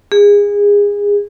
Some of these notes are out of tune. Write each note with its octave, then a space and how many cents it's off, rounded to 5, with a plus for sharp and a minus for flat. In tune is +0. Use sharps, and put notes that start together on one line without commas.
G#4 -25